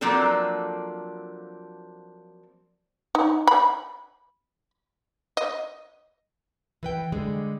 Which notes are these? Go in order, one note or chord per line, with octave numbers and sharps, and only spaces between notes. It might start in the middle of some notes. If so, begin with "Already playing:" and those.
F3 F#3 A#3 C4 D4 A4
D#4
B5
D#5
E3 B4 G5
D3 G3 G#3 G#4